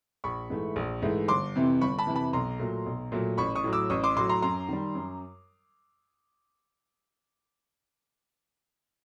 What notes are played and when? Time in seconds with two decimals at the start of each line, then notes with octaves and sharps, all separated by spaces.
0.24 A#1 B5 C#6
0.50 G#2 E3 A3
0.76 A#1
1.02 G#2 E3 A3
1.28 G1 C6 D6
1.55 F2 C3 E3
1.81 G1 B5 C#6
1.99 A5 B5
2.07 F2 C3 E3
2.15 A5 B5
2.33 B1 A#5 C6
2.59 A#2 F#3 A3
2.86 B1
3.12 A#2 F#3 A3
3.38 A1 B5 C#6
3.55 C#6 D#6
3.64 A2 F#3
3.73 D6 E6
3.90 A1 C#6 D#6
4.04 C6 D6
4.16 A2 F#3 C6 D6
4.29 A#5 C6
4.42 F#2 A#5 C6
4.69 D#3 G3
4.95 F#2